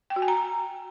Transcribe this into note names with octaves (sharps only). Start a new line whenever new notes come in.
G5
F#4
G#5
A#5